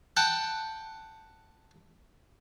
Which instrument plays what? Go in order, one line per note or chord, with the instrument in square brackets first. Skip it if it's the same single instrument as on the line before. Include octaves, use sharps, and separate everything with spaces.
[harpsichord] F#5 G5 A5